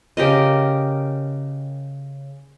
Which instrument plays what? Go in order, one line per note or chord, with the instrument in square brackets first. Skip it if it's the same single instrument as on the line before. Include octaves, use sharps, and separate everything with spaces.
[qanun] C#3 G4 A#4 D#5